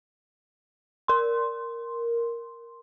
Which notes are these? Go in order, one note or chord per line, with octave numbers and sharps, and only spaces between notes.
A#4 C6